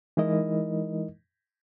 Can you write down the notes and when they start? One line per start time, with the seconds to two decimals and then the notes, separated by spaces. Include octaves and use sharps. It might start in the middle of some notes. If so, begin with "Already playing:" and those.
0.17 E3 G#3 D#4 E4 A#4 D#5